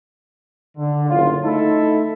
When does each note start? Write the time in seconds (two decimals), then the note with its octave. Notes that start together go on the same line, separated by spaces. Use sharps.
0.78 D3
1.09 F#1 A2 F4
1.44 A3 D#4 E4 A4